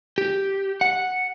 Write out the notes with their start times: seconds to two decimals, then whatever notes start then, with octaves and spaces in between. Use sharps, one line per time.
0.18 G4
0.81 F#5